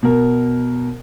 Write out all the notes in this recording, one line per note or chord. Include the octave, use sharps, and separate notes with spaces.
B2 A#4